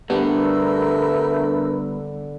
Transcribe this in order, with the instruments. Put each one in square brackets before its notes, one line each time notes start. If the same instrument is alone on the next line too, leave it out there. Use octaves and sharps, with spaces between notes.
[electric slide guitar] D3 [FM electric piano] G3 B3 D4 [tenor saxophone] A3 [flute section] A#4 B4 E6